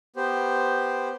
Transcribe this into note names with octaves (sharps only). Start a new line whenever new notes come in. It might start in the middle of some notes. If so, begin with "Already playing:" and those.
B3 G4 C5